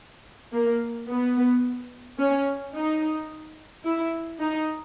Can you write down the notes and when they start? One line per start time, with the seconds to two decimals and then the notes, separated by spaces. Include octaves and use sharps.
0.53 A#3
1.09 B3
2.19 C#4
2.75 D#4
3.85 E4
4.40 D#4